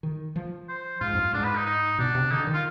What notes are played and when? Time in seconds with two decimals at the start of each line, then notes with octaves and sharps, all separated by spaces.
0.03 D#3
0.36 F3
0.69 C5
1.01 G#2 F4
1.13 F2
1.18 G2
1.33 G#2 D4
1.44 B4
1.56 D#4
1.66 D#4
1.98 B2 D4
2.15 C3
2.31 D3 D#4
2.47 D#3
2.53 F4